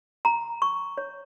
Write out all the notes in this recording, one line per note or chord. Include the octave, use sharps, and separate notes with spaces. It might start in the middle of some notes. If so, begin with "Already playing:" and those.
A#5
C#6
C#5